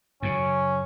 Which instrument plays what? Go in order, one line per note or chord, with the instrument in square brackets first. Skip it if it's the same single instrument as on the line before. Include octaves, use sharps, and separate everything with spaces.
[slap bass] F#2 C#3 [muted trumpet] C#4